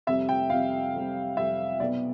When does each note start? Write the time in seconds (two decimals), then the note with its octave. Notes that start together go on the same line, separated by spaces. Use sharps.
0.07 F2 C3 G3 E5
0.29 G5
0.50 F2 C3 G3 F5
0.93 F2 C3 G3
1.37 F2 C3 G3 E5
1.80 B1 B2 B3 D5